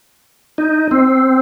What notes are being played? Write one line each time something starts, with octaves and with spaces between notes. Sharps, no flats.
D#4
C4